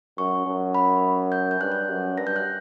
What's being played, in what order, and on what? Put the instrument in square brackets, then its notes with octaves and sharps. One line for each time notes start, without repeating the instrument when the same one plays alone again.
[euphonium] F#2 [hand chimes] C#6
[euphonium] F#2
[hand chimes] B5
G6
G6
[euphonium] G2 [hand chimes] F#6
[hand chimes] G6
[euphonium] F#2
[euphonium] G2 [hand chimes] A#6
[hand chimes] G6
F#6